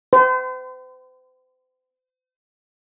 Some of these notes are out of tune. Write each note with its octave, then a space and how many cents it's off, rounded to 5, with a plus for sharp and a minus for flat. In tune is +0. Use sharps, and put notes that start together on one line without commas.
C5 -40